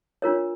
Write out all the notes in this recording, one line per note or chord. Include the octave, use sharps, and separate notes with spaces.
D4 F4 A#4 C#5